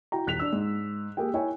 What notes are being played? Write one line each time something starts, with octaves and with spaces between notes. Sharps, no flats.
E4 F#4 G5 A#5
D#1 F#6 B6 F7
D4 E6
G#2
A#3 G4 G#4 G5
E4 C#5 G5 G#5